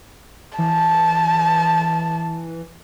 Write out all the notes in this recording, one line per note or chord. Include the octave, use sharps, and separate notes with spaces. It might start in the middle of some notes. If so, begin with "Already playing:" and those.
E3 A5